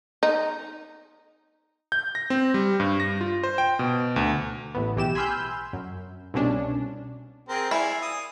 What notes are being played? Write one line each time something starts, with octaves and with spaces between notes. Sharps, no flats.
D#4
G6
A#6
C4
G3
G2
A#6
F4
C5
G5
B2
D2
A1 A2 B3
B1 E3 G4 E7
G#5 B5 C6 E6 F6 G6
F#2
C2 B2 C#4 D4
C4 G#4 A#4
E4 D5 F5 G#5
D#6